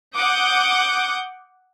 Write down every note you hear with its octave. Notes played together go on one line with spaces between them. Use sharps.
F#5 D6 D#6 G6